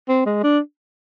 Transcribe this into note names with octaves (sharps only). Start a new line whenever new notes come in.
C4
G#3
D4